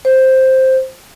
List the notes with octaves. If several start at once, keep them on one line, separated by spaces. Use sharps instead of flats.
C5